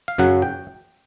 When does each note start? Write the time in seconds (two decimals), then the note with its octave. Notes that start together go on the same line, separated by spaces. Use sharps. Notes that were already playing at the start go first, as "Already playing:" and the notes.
0.08 F5
0.18 F#2 C#3 F#3 F#5
0.42 G5